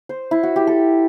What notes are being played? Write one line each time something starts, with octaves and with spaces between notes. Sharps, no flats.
C5
E4
F#4
G4
A4